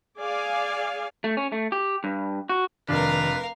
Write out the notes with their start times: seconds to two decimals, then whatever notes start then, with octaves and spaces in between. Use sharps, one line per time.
0.19 G#4 D5 F5 G#5
1.24 A3
1.37 C#4
1.52 A3
1.72 G4
2.04 G2
2.49 F#4
2.88 F1 D#3 D4 A#4 B4 F5